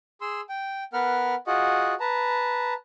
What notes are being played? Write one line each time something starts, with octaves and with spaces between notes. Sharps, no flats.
G#4 C6 E6
G5
B3 A#4 B4 F#5 F6
F4 F#4 G#4 D#5 F#5
B4 A5 A#5